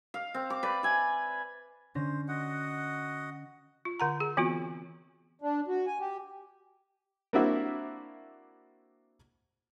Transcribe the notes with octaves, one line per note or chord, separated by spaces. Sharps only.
F5
C4
D6
B4 D5
E5 G#5
D3 C#4 C5 A#6
F#4 D#5 F#5
F4
D3 F#5 A#5
G#4
E3 B3 C4 F4 F#4
D4
F#4
G#5
G4
A#3 C4 D4 E4 F#4 E5